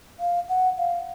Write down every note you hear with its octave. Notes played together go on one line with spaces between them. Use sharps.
F5
F#5
F5